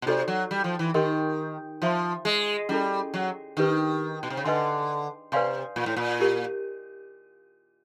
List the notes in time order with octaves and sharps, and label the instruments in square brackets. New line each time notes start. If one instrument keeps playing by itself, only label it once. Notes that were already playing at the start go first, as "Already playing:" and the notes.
[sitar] B2
[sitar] C3 [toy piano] D#4 F#4 A4 D5
[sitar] F#3
G3
F3
E3
[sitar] D#3 [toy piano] G4 A#4 D#5 G5 C6
[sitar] F3 [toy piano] C5 E5 A5 C6
[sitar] G#3
[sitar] G3 [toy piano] C#4 E4 A4
[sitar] F#3
[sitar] D#3 [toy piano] D4 G4 B4
[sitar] B2
C3
C#3
[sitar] D3 [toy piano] B4 D#5 G#5 C6
[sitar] C3 [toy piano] B4 D5 F5 G#5 C6
[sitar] A#2
A2
A#2
[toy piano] E4 G4 A#4